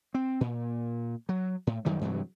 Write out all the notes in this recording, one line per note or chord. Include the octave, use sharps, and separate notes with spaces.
C4
A#2
F#3
A2
F#2 D#3 F#3 G3
G2 C3 E3 F#3